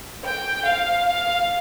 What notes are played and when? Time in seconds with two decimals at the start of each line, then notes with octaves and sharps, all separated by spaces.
0.25 G5
0.66 F5
1.06 F5